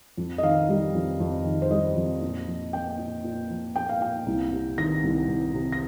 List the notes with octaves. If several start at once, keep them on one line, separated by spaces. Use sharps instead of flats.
F2
D#5
D#3 F5
G3
F2
F2
D#3
C5
G3 D#5
F2
A#2
F3
A#3 G5
A#2
A#2
F3
A#3 G5
F5
A#2 G5
C2
C3
D#3 A#6
C2
C2
C3
A#6